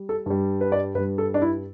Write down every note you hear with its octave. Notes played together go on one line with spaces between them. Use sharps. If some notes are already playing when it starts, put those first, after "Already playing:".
Already playing: G3
A4
G2 G3
B4
D5
G2 G3 B4
A4
D4
E4